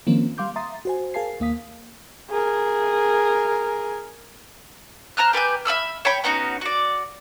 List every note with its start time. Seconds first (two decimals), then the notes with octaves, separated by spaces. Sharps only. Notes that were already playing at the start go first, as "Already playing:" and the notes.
0.07 D#3 F3 A#3 C4 C#4
0.38 G3 F5 C6 D6 G6
0.56 E5 A#5 C6 D#6 A6
0.85 F#4 C5 G#5
1.14 G#4 A#4 F5 G#5 A5 C7
1.40 D#2 A#3 F5 D#6 B6
2.30 G#4 A#4
5.17 C5 A#5 F6 F#6
5.33 G4 B4 G#5 G6
5.65 E5 B5 E6 F6
6.05 C#5 G5 B5
6.24 B3 C#4 D#4 F#4
6.61 F#4 D5